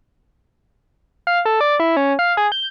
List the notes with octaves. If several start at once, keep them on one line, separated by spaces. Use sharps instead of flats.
F5
A4
D5
E4
C#4
F5
G#4
G6